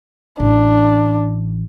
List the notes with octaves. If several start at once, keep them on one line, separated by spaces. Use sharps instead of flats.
A1 D4